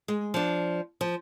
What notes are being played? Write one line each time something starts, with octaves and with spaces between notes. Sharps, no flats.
G#3
F3 D4
F3